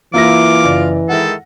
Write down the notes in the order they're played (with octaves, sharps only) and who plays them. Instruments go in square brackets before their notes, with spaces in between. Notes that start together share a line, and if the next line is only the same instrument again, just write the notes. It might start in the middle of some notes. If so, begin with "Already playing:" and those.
[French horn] E3 [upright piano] A#3 E4 A#6 [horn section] F4 [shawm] D6
[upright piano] F#1 D5
[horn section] D#3 G#3 E4 [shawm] A4 [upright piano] F#5